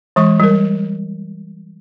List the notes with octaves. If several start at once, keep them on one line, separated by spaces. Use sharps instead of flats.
E3 G#3 C#6
G3 A#4